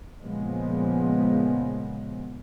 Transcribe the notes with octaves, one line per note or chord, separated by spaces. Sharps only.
A#2 C#3 F3 G#3 B3